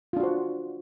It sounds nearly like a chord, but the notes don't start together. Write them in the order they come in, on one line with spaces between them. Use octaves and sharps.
F4 D4 F#4 C5